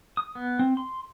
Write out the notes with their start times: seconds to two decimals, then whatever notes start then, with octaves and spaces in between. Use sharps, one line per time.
0.17 D#6
0.35 B3
0.59 C4
0.77 C6